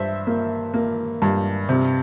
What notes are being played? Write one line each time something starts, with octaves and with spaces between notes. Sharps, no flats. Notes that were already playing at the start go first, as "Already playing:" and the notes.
Already playing: G2 C5 E5
A#3
A#3
G2
C3